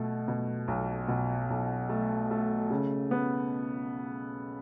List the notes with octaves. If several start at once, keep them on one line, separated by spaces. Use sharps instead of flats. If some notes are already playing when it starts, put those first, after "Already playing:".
Already playing: B2 A3
B2
B1
B2
B1
A3
A3
C#3
B3